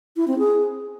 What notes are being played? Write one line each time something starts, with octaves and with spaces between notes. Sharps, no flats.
E4
C4
G#4